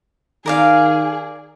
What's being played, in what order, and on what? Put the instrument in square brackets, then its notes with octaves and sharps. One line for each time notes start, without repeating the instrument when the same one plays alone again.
[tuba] D#3 [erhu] G#4 [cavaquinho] A#4 D5 F5